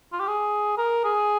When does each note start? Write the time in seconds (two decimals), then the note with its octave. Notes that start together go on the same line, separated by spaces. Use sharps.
0.13 F4
0.20 G4
0.28 G#4
0.78 A#4
1.04 G#4